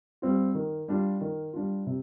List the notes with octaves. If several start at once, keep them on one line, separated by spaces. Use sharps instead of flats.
G3 C4 F4
D#3
G3 D4 F4
D#3
G3 D4 F4
C3